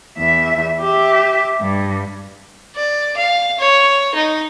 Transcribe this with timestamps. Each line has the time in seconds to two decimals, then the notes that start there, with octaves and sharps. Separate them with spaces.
0.18 E2 E5
0.81 G4 E5
1.61 G2
2.75 D5
3.16 F5
3.59 C#5
4.15 D#4